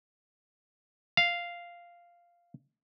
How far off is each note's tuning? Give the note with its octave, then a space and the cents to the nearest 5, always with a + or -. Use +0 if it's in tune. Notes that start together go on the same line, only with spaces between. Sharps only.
F5 -5